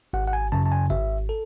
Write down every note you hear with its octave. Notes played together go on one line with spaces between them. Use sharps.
G#1 F#5
F#5
G#5
F#2 C#3 A5
A5
G#5
G#1 E5
A4